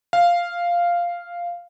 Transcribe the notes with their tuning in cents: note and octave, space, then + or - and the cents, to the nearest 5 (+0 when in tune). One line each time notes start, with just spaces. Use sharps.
F5 -5